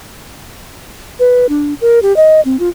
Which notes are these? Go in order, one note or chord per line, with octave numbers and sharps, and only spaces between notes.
B4
D4
A#4
G4
D#5
C4
F4